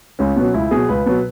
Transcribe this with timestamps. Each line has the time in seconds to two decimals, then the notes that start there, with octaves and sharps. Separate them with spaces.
0.19 C#2 C#4
0.36 B2 F#3
0.54 C#2 E4
0.71 B2 F#3 G#4
0.89 C#2 B4
1.06 B2 F#3